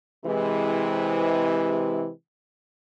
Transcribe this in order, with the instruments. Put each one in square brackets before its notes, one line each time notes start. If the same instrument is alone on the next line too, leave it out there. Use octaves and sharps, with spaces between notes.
[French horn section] C3 E3 G#3